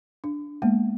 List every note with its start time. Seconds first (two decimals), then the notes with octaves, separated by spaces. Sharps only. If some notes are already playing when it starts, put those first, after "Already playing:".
0.24 D4
0.62 G#3 A#3 B3